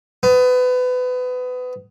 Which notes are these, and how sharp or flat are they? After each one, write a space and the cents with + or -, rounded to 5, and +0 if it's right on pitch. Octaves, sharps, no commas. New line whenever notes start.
B3 +25